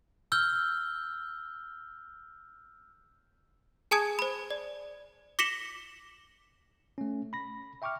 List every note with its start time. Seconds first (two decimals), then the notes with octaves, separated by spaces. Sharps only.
0.32 E6 F6 G6 G7
3.91 G#4 G#5 A5 D#6 G#6
4.19 C5 B5
4.50 D5
5.39 D6 A#6 B6 C#7 E7 F#7
6.98 A3 C#4
7.33 B5 A#6
7.82 E5 G5 C#6 D6 F6